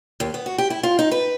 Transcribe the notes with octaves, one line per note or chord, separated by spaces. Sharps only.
D#2
B3
F#4
G4
E4
F4
D#4
B4